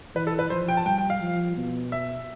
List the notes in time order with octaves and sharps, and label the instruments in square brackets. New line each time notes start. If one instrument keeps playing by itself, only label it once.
[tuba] E3 [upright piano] B4
[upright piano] A4
B4
[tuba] F3 [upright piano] C5
[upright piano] G5
A5
[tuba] G3 [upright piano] G5
[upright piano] G5
F5
[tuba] F3
B2
[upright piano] E5